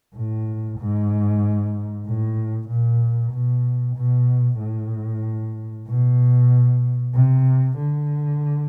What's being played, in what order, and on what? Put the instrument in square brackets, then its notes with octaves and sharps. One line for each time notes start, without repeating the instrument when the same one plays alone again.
[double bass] A2
G#2
A2
A#2
B2
B2
A2
B2
C3
D3